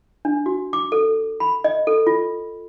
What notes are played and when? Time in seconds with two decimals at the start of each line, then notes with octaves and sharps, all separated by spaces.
0.25 D4
0.46 F#4
0.73 D6
0.92 A4
1.40 B5
1.64 D#5
1.87 A4
2.07 F4